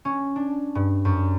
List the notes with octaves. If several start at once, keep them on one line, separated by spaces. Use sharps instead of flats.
C#4
D4
G2
F#2